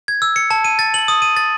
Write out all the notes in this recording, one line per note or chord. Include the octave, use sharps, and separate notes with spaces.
G#6
E6
C#7
A5
D#7
A6
F#7
D#6
D#7
A6